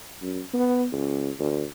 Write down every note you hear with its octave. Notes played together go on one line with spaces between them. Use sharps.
F#2
B3
C#2
D2